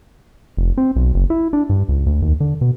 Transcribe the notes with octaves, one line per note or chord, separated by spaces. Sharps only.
F1
C4
B1
F#1
E4
D4
G2
C#2
D2
D#2
D3
B2